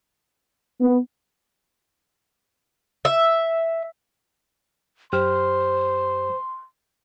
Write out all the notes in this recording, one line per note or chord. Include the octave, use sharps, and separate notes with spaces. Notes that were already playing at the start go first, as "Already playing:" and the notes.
B3
E5
F#2 G4 C5 C6 F6